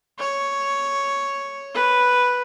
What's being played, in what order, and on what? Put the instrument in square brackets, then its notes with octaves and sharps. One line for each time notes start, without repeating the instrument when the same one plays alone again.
[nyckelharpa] C#5
B4